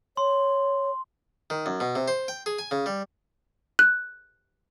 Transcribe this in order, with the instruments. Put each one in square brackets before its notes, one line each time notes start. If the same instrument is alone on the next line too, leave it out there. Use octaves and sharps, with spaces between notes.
[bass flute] C#5 [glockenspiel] C6
[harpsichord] D#3
F#2
B2
C3
C5
G5
G#4
G#5
C#3
G3
[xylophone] F#6